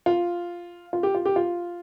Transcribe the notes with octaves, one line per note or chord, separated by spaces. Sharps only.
F4
F4
G4
F4
G4
F4